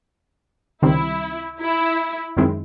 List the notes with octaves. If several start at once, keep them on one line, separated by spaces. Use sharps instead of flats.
C#2 C3 D#3 G3 C4 E4
E4
F#2 D#3 G#3 C4 E4